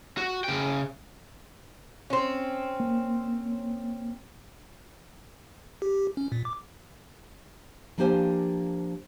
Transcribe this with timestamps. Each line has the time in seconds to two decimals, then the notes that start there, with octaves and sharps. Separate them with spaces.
0.17 F#4
0.44 C#3 G5
2.10 C4 C#4
2.80 A#3
5.82 G4
6.17 C#4
6.32 A#2
6.45 D6
7.98 F3 A#3 D4 G4 C5 G#5